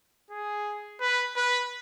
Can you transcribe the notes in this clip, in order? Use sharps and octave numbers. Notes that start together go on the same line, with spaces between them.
G#4
B4
B4